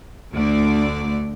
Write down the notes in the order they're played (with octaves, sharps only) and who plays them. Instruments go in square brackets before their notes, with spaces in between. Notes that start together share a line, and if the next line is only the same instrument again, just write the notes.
[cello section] D2 D3 A3 D5